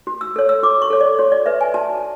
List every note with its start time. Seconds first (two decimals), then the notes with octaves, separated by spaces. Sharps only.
0.07 F#4
0.21 E6
0.36 A4 C#5
0.49 E6
0.63 F#4 D6
0.82 C#6
0.90 A4 C#5
1.01 D5
1.19 F#4 C#5
1.32 D5
1.46 B4 E5
1.61 G#5
1.74 F#4 A5